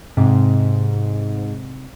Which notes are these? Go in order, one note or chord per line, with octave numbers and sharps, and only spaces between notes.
G#2 C3